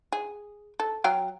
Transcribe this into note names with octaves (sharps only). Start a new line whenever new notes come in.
G#4
A4
F#3 F5 G5